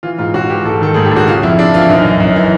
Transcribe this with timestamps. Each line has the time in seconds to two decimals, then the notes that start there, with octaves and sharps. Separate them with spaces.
0.03 E3 F4
0.19 G#2 F4
0.34 G#2 F#4
0.50 E3 G4
0.65 G#2 A4
0.81 D#3 A4
0.94 G#2 G#4
1.05 G4
1.11 G#2
1.16 F#4
1.27 C#3 F4
1.43 F2 E4
1.58 C#3 D4
1.74 E3 F4
1.82 E4
1.89 F#2 D#4
2.04 F#2
2.20 F#2
2.35 E3